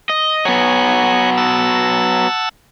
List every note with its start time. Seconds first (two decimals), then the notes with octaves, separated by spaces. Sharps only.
0.10 D#5
0.45 F#3 B3 C#5 F#5 G#5
1.38 F#5 A5 E6